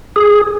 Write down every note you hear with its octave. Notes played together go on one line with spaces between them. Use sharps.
G#4